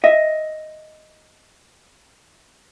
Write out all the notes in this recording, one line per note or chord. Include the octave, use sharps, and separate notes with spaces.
D#5 E5